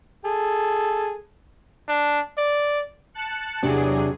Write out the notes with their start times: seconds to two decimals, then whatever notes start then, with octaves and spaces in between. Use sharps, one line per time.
0.25 G#4 A4
1.88 D4
2.38 D5
3.14 A5 F#6 C#7
3.63 E2 C3 F#3 D4 G4 G#4